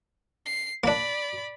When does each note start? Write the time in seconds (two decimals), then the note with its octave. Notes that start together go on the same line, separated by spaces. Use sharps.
0.45 C7
0.84 A#3 D4 D5 B5